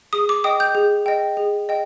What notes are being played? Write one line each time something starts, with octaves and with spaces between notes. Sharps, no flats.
G#4 D#6
D6
D#5 G5 D#6
G6
G#4
D#5 G5
G#4
D#5 G5